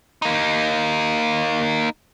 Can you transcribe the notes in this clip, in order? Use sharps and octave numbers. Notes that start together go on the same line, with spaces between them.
A#3 D#4